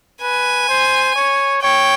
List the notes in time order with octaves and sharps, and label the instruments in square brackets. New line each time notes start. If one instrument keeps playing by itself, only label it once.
[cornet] B4 [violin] G#5
[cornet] C5
C#5
[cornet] C#5 [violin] G5